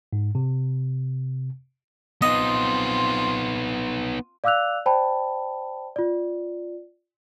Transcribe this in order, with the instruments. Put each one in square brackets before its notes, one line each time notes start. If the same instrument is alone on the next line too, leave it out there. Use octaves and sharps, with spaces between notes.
[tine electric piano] G#2
C3
[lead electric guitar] B3 D#4 [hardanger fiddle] C4 F4 [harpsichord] D#5
[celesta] D5 F5 D6 E6 F#6 F7
C5 D5 G5 A5 B5
F4 D5